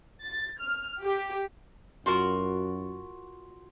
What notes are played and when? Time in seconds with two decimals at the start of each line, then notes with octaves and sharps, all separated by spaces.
0.23 A6
0.60 F6
1.01 G4
2.06 F#2 F4 F#4 A#4